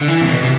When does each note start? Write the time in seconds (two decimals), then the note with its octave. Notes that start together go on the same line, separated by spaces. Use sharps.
0.01 D3
0.08 E3
0.21 C3
0.29 B2
0.43 C3